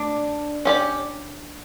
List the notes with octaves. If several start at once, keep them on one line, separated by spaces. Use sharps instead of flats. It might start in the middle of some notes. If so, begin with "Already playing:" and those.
Already playing: D4
C#4 G4 D5